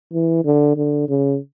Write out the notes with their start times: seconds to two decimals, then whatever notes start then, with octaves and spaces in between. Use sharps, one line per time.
0.13 E3
0.45 D3
0.76 D3
1.09 C#3